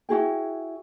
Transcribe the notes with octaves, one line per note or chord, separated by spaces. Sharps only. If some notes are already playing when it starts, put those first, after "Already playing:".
E4 F#4 G#4 G5